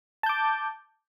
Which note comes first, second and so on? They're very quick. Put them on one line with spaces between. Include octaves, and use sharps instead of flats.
A5 G6 D6